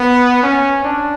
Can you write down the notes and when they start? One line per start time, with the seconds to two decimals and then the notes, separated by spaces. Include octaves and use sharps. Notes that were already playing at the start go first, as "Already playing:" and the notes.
Already playing: B3
0.43 C#4
0.84 D4